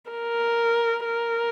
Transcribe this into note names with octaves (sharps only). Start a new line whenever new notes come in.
A#4
A#4